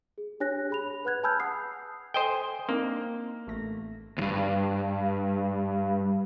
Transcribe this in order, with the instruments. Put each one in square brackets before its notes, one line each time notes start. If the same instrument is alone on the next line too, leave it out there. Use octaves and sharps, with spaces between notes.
[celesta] G#4
D4 G4 C#5 G#5 F#6 A#6
G#4 B5 F7
B4 F#5 F#6 G#6
G#5 A5 B5 E6 F6 G6
F#5 D#6 C7
[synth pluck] A4 G#5 [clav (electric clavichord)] C5 D#5 G5
[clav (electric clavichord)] A#3 [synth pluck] C4 D4 D#4
[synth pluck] A1 A3 A#6
[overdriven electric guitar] D2 G2